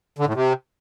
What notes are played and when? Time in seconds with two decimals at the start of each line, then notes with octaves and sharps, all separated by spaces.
0.19 D3
0.26 A2
0.34 C3